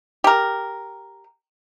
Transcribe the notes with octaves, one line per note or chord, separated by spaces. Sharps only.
G4 A#4